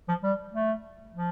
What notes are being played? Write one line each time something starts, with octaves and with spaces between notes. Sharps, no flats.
F3
G3
A3
F3